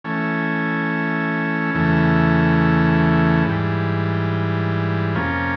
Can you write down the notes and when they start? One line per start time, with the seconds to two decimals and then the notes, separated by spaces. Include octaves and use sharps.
0.04 E3 A3 C#4
1.75 E2 C#3 E3 A3
3.45 G#2 E3 G3
5.15 F2 C3 F3 A#3 C#4